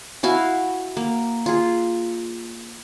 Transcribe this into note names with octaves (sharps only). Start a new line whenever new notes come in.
E4 F#4 F5 G#5
A#3
F4 G#4